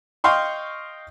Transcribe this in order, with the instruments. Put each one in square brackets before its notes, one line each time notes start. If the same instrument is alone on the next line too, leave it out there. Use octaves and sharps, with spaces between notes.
[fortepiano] D#5 F5 G5 C6 C#6